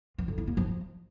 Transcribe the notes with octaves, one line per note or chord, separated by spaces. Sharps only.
F3
D3
E4
A#3
F3